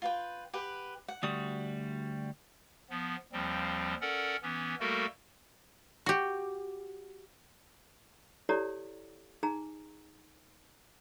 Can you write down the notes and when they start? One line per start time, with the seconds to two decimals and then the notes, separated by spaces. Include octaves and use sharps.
0.02 F4 B4 G5
0.53 G4 B4 F#5
1.08 F#5
1.23 D2 G3 F#4 D#6
2.90 F3 B3
3.33 D#2 F3 G3 C4
4.01 C#4 A4 A#4 D5 F#5
4.43 E3 B3 C#4
4.80 G3 A3 A#3 F#4 A4 A#4
6.06 F#4 G4
8.49 E4 G4 A4 C#5 D5 A#5
9.43 D#4 G#4 G#5 A#5